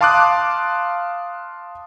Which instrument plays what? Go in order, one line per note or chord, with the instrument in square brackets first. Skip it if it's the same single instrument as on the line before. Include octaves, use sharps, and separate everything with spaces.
[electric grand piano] F5 A5 C6 D6 D#6 F#6